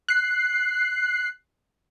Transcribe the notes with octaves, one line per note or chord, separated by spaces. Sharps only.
F#6 C7